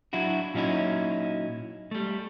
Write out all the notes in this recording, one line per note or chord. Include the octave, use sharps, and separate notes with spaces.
F#3 D4 E4 F#4
A#2 F#3 C#4 D#4 E4
G3 A3